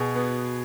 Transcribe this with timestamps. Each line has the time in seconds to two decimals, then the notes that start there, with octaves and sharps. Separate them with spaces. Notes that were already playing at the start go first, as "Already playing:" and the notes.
Already playing: B2 G#4
0.15 B3